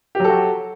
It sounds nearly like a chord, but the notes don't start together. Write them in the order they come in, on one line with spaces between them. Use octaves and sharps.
G4 F#3 A4 F#4